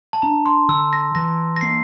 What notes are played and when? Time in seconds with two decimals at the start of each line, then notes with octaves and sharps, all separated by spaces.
0.13 A5
0.22 D4 A#5
0.46 C6
0.69 D3 E6
0.93 A#6
1.15 E3 A#6
1.56 A#6
1.61 A#3 C7